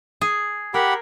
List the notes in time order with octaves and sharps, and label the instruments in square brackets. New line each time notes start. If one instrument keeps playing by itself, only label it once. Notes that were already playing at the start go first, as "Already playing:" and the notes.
[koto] G#4
[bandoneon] G4 F#5 B5 [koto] A#4